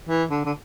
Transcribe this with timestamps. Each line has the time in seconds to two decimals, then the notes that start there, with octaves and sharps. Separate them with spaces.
0.08 E3
0.30 D3
0.45 D3